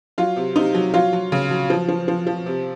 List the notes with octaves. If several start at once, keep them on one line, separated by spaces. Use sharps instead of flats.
F#3 F4
C3
C3 D#4
F#3
F#3 F4
F#3
C#3
F#3
F3
F3
F3
F3
C3